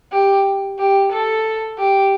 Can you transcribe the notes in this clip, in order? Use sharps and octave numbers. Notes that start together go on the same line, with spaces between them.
G4
G4
A4
G4